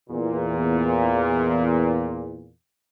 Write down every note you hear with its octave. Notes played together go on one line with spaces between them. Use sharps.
E2 A#2